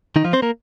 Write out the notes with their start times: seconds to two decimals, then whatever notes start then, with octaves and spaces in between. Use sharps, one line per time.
0.16 D#3 D#4
0.24 F3 F4
0.33 C4 C5
0.42 A#3 A#4